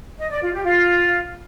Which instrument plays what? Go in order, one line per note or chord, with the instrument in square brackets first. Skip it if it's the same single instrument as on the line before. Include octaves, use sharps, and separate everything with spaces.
[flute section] D#5
D5
F4
G4
F4